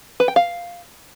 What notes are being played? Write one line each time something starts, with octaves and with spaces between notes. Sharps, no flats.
B4
G5
F5